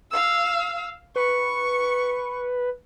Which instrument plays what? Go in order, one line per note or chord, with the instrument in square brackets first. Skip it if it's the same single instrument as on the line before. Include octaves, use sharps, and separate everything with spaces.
[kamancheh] F5 E6
[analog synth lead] B4 [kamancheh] C#6